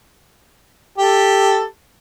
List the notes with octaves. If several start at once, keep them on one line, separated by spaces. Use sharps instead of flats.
G4 A4